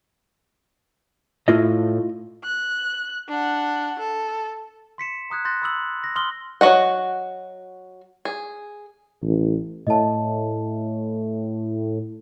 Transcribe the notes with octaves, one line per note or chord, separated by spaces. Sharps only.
A2 E4 F4 D#5
F#6
D4 F#5
A4
C6 B6 C#7 E7
A#5 D#6 F#6 G#6
C6 F#6 G6 A6 A#6
B5 D#6 E6 F#7
A#6
C6 D#6 F6 F#7 G7
F#3 F#4 D#5 F#5
G#4
A1
A2 D#5 A5